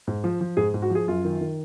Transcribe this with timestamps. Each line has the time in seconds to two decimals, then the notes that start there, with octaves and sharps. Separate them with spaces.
0.07 G#2
0.24 F3
0.41 F3
0.57 G#2 G#4
0.74 G#2
0.82 F#4
0.90 F3
0.95 G#4
1.08 F#2 F4
1.24 D#3
1.41 D#3